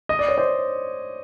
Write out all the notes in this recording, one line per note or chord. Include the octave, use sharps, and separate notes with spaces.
D#5
D5
C#5
C5 D5